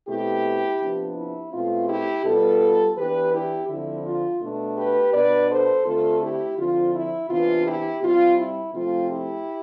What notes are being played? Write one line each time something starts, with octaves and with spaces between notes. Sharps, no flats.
B2 A3 C4 E4 G4
C3 F3 B3 D4
E4
B2 A3 C4 F4
E4 G4
B2 G3 B3 F4 A4
E3 B3 D4 G4 B4
E4 G4
D3 F3 C4 E4
F4
B2 A3 D4
G4 B4
B2 B3 D4 B4 D5
A4 C5
D3 A3 C4 F4 A4
E4 G4
D3 F3 C4 F4
E4
C3 E3 B3 D4 F4
E4 G4
C3 G3 C4 F4
E4
C3 F3 A3 C4 F4
E4 G4